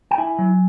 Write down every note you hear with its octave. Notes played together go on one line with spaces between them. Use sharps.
G5
E4 G#5
F#3